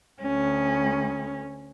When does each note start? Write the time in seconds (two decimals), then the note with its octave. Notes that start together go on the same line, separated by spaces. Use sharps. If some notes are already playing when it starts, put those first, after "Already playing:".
0.22 D2 C#4